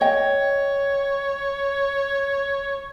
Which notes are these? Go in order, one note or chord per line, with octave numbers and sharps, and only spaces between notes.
C#5 D#5 G5